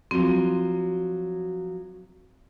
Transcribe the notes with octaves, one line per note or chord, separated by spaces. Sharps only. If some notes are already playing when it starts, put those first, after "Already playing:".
F3 F#3 C4